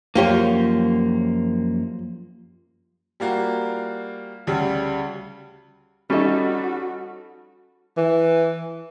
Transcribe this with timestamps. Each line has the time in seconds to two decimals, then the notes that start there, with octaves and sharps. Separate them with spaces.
0.15 F#2 F3 A#3 F4 G4 C#5
3.20 G3 A#3 F4 F#4
4.47 D2 C#3 G3
6.10 G3 C#4 D#4 F#4 A4
7.97 E3